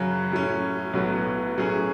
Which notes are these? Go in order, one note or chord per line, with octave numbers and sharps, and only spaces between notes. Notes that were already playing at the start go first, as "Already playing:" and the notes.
Already playing: F#2 C#3 F#3
A2 F#3 C#4
B1 A2 F#3 B3
A2 F#3 C#4 G#4